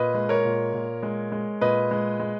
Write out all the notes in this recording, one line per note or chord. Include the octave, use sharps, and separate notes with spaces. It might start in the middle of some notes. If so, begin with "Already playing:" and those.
Already playing: A#2 B4 D#5
G#3
A#4 C#5
A#2
A#2
G#3
G#3
A#2 B4 D#5
G#3
G#3